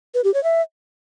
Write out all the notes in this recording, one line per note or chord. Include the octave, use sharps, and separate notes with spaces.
B4
G4
C#5
E5